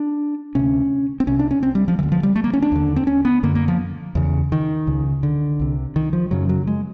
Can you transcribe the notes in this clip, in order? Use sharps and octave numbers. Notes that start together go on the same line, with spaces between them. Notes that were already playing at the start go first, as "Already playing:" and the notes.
Already playing: D4
D2 C3 C#4
C4
C2 C3 C#4
D4
C#4
C4
G3
F3
D2 D3 E3
F3
G3
A3
A#3
C#4
D4
D#2 D3
C4
C#4
B3
F#2 D3 A#3
A#3
F3
E2 C#3
D#3
C#2 C#3
D3
C2 C3
D#3
F3
F#2 C#3 F#3
F#3
G#3